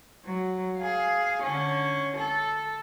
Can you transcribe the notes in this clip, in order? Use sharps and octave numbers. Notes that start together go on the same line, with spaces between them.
F#3
G#4 F5
D3 C#4
A4